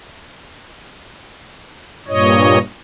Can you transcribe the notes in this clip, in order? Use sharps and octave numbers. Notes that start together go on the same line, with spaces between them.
G2 A#2 C#5 D#5